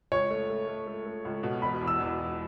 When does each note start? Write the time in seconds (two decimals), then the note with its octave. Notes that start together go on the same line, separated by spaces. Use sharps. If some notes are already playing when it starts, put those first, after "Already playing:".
0.12 C#2 C#5
0.30 A3
0.50 A3
0.68 A3
0.87 A3
1.06 A3
1.25 C#2
1.43 B2
1.62 E1 B5
1.81 E2
1.87 E6
2.00 E2
2.19 E1